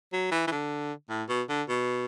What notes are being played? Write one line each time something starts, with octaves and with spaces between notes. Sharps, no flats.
F#3
E3
E3
D3
A2
B2
D3
B2